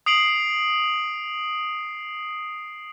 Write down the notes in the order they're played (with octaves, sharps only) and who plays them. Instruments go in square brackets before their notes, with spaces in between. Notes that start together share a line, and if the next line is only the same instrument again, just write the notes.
[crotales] D#6 C7 D7 F#7